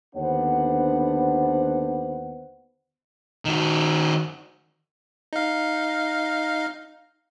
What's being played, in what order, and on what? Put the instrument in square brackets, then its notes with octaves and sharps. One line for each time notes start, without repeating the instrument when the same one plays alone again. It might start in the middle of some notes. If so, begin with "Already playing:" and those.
[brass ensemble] D#2 D3 B3 D4 C5 F#5
[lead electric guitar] D#3 F#4
[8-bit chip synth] D#4 F5